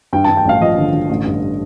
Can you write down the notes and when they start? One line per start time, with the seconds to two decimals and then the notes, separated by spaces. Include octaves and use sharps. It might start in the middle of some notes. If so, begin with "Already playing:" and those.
0.13 G2 G5
0.24 G2 A5
0.37 G5
0.45 A1 F5
0.61 F3 D#5
0.78 D3
0.93 D3
1.09 A1
1.25 G2